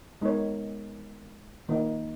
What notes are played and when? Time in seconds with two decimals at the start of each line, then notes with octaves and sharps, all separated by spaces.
0.22 G#3 B3 D#4 A#4 C#5
1.69 D#3 A#3 D#4